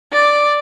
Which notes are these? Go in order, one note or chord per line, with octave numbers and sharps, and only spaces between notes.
D5